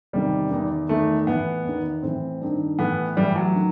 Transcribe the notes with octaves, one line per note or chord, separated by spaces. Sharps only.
E2 C3 D#3 G3
E2 D#3
E2 D#3 A3
A2 E3 B3
E2 D#3
A2 E3 C4
G2 D#3
A2 E3 B3
A2 E3 G3
F#3
D#3